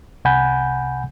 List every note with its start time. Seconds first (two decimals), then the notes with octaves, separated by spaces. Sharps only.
0.25 C2 C3 F#5 G#5 B5 G6